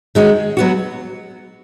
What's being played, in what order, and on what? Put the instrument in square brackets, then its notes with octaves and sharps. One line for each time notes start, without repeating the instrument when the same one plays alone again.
[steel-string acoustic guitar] D#3 G#3 C#4 F#4
F#3 B3 F#4